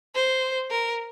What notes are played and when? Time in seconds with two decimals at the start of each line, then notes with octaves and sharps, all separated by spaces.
0.15 C5
0.71 A#4